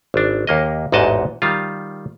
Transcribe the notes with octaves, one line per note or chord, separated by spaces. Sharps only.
G#1 D4
D#2 A#3 D#5
A1 E2 G#2 F#4 D#5 A5
D#3 G3 F4